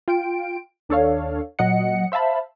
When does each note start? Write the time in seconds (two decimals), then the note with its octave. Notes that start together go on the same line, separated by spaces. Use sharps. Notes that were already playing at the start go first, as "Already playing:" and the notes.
0.08 F4 G5 D7
0.89 D#2 D4 A4 C#5 F5
1.59 A#2 F#3 D#5 F#5 C#7
2.12 C5 E5 F5 A5 B5